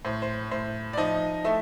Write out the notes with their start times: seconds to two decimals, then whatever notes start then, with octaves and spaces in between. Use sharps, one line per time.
0.05 A2 C5
0.22 C5
0.51 A2 C5
0.93 D5
0.97 F3 D#4 D#5
1.44 A3 E4 E5